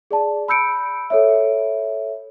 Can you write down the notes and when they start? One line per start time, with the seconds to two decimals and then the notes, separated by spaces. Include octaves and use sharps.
0.11 G#4 D5 A5
0.48 B5 E6 G6 C#7 D7
1.10 A4 C#5 E5